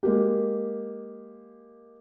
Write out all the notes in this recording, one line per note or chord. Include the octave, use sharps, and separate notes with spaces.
G#3 A#3 G4